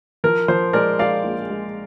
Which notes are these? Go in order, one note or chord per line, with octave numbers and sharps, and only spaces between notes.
F3 A#4
F3 C5
G#3 A#4 D5
G#3 D5 F5
A#1
G#3